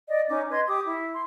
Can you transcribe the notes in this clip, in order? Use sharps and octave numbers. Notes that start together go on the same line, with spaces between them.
D5 D#5
C#4 D#4 D6
B4 D#5 C6 G#6
G4 D6 D#6
E4
C6